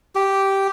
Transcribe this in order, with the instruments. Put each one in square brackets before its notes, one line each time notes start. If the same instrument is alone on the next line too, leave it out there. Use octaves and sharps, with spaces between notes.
[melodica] G4